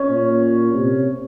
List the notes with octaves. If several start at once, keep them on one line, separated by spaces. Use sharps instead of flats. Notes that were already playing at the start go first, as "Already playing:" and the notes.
Already playing: C#4
A#2
C3